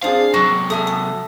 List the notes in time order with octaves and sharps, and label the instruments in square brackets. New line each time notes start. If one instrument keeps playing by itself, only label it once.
[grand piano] C4 D4 G#4 [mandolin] F4 D#6 [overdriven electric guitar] F5
[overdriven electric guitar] C3 F#3 [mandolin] F#4 [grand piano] A#6
[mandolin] D#4 G#5 D#6 [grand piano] A4 E5
[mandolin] D#6